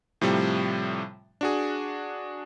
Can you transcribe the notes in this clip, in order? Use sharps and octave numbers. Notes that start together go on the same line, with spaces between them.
A2 C3 F3 G3
D4 F#4 G#4